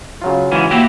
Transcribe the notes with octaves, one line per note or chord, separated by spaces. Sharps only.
C#3 F#3 F4
G#2 E3 C#4
A#3 E4 F#4 G4